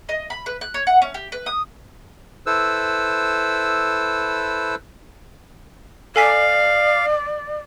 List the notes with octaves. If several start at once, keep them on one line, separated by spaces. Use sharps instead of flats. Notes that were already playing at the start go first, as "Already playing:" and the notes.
D#5
B5
B4
F#6
C#5
F#5
C#4
G4
B4
D#6
E4 A4 B4 C5 E6
A4 D5 F5 G#5 B6